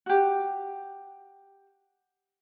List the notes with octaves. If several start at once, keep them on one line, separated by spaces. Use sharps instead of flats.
F#4 G4